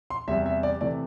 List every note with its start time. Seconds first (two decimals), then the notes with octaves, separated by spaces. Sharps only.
0.10 C6
0.28 E2 C3 G3 E5
0.46 E5
0.63 D5
0.81 C3 E3 A3 D5